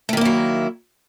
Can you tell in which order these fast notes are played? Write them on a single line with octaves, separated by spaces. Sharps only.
A3 D#3 A#3 E4 F#3